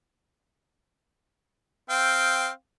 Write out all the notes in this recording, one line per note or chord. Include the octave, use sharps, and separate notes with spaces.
C4 F5 G5